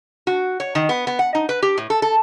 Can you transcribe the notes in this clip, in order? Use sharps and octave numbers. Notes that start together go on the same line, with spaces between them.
F#4
C#5
D#3
B3
B3
F#5
D#4
B4
G4
A2
A4
A4